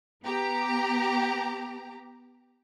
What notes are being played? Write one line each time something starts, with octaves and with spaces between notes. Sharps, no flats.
B3 G4 A#5